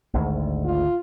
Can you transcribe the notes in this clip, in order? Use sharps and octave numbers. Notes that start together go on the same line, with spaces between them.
G#1 D2
F4